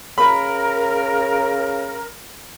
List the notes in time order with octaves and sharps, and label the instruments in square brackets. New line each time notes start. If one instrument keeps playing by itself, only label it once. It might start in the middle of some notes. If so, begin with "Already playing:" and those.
[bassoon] C#3 [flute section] A#4 [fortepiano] B5